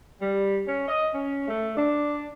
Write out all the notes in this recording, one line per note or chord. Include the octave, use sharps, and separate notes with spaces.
G3
C#4
D#5
C#4
A3
D4